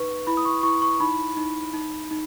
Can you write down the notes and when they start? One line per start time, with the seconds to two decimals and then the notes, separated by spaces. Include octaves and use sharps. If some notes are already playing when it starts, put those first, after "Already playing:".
Already playing: D#4 B4 C#6
0.27 E4 B5
0.37 D#6
0.45 C#6
0.63 E4 C#6
0.82 C#6
1.00 D#4 B5
1.37 D#4
1.74 D#4
2.11 D#4